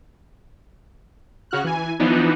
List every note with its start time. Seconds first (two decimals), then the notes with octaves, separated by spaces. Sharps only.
1.51 C#3 F#4 F6 F#6
1.64 E3 G#5
2.00 E3 F3 B3 D4 D#4